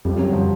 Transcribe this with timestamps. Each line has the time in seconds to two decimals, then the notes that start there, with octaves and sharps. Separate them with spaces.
0.05 F2 G3
0.18 F#2 F#3
0.33 F3